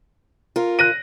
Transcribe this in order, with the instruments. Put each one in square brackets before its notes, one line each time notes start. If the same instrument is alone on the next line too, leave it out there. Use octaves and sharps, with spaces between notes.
[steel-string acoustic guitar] F4 A#4
[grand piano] F#6 A#6 D#7